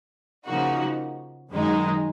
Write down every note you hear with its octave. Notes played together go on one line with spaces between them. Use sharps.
C#3 F3 A#3 D#4 F#4
F#2 D#3 G#3 D#4